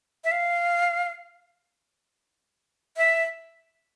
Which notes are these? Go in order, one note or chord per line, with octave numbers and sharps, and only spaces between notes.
E5
F5
E5